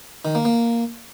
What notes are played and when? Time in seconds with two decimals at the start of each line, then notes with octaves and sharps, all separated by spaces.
0.25 D#3
0.35 A#3
0.45 A#3